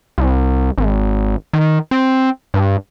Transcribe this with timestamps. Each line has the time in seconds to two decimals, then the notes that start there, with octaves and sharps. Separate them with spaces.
0.18 C2
0.78 G#1
1.53 D#3
1.91 C4
2.54 G2